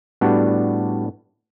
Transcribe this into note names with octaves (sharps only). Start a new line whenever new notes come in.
A2 G3 B3 D4 F#4